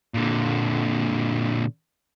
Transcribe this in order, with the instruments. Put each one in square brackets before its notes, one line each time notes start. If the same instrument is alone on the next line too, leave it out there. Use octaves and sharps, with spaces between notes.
[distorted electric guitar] A#2 D3